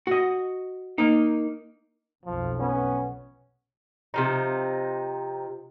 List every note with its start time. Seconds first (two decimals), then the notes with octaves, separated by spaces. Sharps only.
0.07 F#4 D#5
0.98 A#3 D#4
2.25 B1 F2 F3
2.60 B3 C#4
4.14 C3 F3 D#4